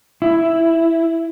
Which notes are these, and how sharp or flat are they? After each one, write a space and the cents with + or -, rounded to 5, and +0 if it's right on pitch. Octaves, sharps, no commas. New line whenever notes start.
E4 +5